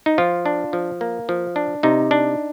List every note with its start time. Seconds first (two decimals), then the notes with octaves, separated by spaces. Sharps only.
0.06 D#4
0.18 F3 F4
0.46 D4
0.73 F3
1.01 A#3
1.29 F3
1.56 D4
1.83 C3 D#4
2.11 D4